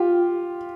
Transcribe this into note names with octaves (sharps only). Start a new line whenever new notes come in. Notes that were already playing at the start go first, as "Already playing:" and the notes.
Already playing: F4 G4